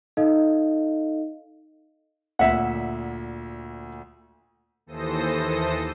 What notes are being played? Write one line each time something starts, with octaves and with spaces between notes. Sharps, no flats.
D#4 A4 D#5 F5
D2 A#2 E5 F#5
D#2 E3 A4 C5 D#6 A#6